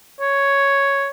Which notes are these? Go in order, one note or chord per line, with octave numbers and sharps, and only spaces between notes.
C#5